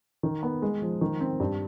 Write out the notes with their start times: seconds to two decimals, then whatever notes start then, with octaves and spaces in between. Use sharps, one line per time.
0.23 D#3
0.43 B3
0.62 G#3
0.82 F3
1.01 D#3
1.20 C4
1.40 G2